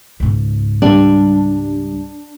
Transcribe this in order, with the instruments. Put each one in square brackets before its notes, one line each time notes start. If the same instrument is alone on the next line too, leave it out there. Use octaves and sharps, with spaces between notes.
[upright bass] C#2 G#2
[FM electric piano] G3 [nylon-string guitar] D4